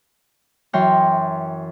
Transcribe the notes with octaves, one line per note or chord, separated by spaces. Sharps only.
F#2 E3 C#5 G5 A#5 C6